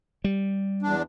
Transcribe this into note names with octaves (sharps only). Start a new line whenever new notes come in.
G3
E2 D4